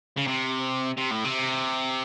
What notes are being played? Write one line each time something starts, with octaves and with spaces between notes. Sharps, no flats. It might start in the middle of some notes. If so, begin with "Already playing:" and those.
C#3
C3
C3
A2
C3